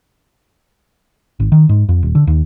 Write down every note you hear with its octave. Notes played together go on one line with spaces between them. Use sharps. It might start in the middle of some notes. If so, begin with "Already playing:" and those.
G#1
D#3
G#2
F2
D#1
D3
D#2